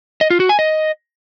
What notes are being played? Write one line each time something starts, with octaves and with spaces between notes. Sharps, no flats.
D#5
F4
F#4
G#5
D#5